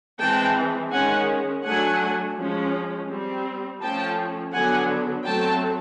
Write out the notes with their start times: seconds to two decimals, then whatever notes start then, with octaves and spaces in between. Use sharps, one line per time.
0.20 E3 G#3 C4 G5 A5
0.92 D#3 G#3 C#4 F#5 G#5
1.64 F#3 A3 D4 F#5 G#5
2.36 F3 G#3 C#4
3.10 G3 C4
3.81 F3 A3 C#4 G5 A5
4.53 D3 F#3 B3 D4 F#5 G#5
5.25 F#3 A3 C4 G5 A5